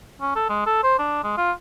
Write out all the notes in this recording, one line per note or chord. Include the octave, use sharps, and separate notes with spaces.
C#4
A4
G#3
A4
C5
D4
G#3
F4